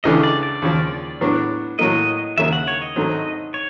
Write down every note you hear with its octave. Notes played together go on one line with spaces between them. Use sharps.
C#2 C#3 E3 A3 D4 D#5
D5
D5
D#2 C#3 F3
A2 F#3 B3 D4
A2 F#3 A#3 D#5
D#2 C#3 F#3 A#3 E5
F#5
C#5
D#5
G#2 D#3 F#3 A3 C4
C#5